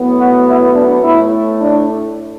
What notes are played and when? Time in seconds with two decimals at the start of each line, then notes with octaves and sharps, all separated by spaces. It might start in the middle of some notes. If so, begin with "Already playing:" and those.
Already playing: A2 F#3 B3
0.17 F#4
0.45 E4
0.73 D4
1.02 A2 A3 E4
1.59 D4